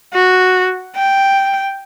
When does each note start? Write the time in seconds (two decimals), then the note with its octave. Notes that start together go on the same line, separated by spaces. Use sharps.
0.13 F#4
0.96 G5